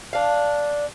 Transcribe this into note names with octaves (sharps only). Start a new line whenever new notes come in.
D4 F5